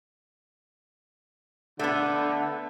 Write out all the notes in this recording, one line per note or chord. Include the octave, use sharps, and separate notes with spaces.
D3 A3 B3